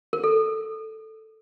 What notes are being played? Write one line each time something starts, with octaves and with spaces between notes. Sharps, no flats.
A#4
A4